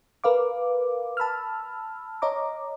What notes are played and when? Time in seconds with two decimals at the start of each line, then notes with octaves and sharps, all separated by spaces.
0.24 A#4 B4 F5 D6
1.17 A5 B5 E6 F6
2.22 C#5 D#5 A#5 D6